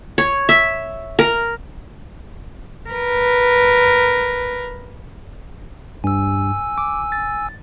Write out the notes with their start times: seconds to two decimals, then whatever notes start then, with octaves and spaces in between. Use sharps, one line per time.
0.18 C#5
0.49 E5
1.19 A#4
2.90 A#4 B4
6.04 G2 G#5 E6
6.78 D6
7.12 A6